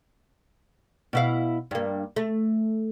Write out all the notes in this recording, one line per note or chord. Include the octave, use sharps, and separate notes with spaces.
B2 E4 F5
G2 A#3
A3